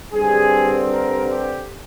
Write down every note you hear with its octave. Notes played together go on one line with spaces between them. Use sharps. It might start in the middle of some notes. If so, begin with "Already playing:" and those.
G2 D3 G3 C4 G#4
A#4
G4